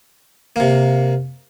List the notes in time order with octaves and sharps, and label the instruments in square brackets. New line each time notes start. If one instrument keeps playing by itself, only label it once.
[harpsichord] C3 A#3